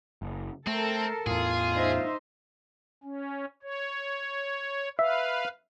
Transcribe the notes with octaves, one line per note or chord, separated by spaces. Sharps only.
F#1
A3 C4 A4 A#4
E2 A2 F4 G#4
D#4 C5 E5
C#4
C#5
B4 E5 F5